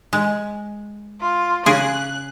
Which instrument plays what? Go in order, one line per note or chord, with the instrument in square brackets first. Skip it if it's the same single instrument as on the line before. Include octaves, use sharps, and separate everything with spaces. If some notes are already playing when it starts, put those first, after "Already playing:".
[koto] G#3
[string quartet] F4
[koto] C#3 G#4 [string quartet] F#6